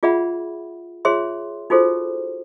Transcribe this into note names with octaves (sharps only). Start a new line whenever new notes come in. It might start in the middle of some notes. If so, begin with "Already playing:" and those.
F4 G#4 D5 E5 F#5 B5
F4 G#4 C#5 E5 C6
D#4 F4 F#4 G#4 A4 C5